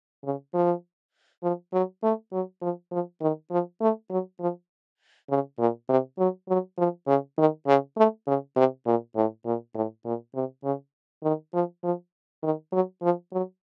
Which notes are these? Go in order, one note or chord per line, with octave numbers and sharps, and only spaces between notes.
C#3
F3
F3
F#3
A3
F#3
F3
F3
D#3
F3
A3
F#3
F3
C#3
A#2
C3
F#3
F#3
F3
C#3
D#3
C#3
A3
C#3
C3
A#2
A2
A#2
A2
A#2
C3
C#3
D#3
F3
F3
D#3
F#3
F3
F#3